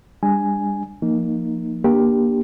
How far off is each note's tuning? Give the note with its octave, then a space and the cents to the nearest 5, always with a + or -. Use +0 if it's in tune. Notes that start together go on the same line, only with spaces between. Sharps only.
G3 +40 D4 +0 G#5 +0
F3 -15 A#3 +0 D#4 +0
A#3 +20 D4 +0 G4 +0